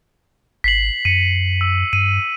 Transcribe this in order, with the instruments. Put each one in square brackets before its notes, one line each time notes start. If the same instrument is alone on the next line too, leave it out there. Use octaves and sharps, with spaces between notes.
[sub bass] G#1 [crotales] B6 C7 F#7
[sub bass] F#2 [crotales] C#7 D#7
[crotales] E6
[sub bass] G2 [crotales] D#7